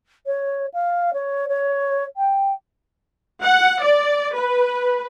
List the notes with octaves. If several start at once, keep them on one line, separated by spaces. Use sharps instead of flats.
C#5
F5
C#5
C#5
G5
F#5
D5
B4